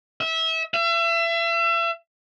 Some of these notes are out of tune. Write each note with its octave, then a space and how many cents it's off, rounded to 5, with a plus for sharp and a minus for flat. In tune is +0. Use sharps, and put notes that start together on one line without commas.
E5 -25
E5 +35